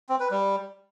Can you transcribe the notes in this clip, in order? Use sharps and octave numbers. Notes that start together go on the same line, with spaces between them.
C4
B4
G3